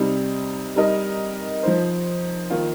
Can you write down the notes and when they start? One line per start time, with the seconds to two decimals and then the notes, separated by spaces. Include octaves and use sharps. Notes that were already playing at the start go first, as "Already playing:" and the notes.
Already playing: C3 G3 D#4
0.76 G3 D#4 A#4 D#5
1.63 F3 D#4 C5
2.50 D#3 A#3 F4